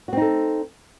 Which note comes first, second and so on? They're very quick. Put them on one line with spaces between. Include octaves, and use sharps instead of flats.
F#4 C4 D#4 A4